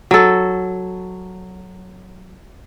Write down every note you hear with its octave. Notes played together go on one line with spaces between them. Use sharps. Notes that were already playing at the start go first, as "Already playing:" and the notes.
F#3 A4